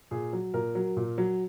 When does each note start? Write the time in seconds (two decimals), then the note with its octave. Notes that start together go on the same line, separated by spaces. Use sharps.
0.11 A#2 G#4
0.33 F#3
0.54 A#2 A#4
0.75 F#3
0.97 A#2
1.18 F#3